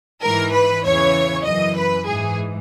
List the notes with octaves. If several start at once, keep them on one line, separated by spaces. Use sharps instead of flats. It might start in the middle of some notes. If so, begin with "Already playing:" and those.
G#2 E3 A#4
B4
E2 C#3 E3 C#5
F#2 E3 D#5
B4
G#2 E3 G#4